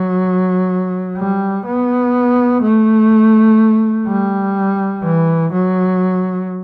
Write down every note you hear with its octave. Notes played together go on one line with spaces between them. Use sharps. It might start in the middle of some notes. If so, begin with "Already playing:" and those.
Already playing: F#3
G3
B3
A3
G3
E3
F#3